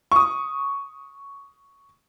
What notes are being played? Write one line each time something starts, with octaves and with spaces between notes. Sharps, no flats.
C#6 D#6